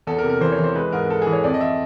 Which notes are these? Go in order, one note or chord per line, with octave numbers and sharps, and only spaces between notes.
E2 A4
A#4
C3
A#4
E3 C5
C#5
E3
C5
G#3 B4
G#2 A#4
G#3 A4
E3 G#4
C#5
F2 D5
D#5
E5